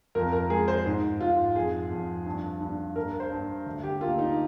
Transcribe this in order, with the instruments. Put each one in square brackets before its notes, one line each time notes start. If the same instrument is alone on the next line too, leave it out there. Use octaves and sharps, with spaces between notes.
[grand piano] F2 A#4
A#4
G#3 G#4
C5
G#2 D#4
G#2 F4
F2 G#4
F2
G2
G2
G2 A#4
C5
G2
D2
G4
A#3 F4
D#4